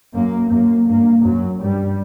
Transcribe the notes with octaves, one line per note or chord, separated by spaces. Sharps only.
F#2 A#3
F#2 A#3
G2 A#3
F#2 F#3
G2 G3